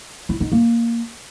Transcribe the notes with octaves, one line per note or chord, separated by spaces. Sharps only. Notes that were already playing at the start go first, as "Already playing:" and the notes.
E4
D#4
A#3